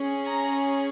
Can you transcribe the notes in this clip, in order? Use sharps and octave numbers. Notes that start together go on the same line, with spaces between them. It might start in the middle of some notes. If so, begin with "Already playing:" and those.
Already playing: C#4 G#4
A#5